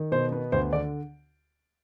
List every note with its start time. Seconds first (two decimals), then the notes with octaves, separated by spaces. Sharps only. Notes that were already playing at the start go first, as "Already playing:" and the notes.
Already playing: D#3
0.12 B2 C5
0.32 B3
0.52 D2 C5
0.73 D3 D5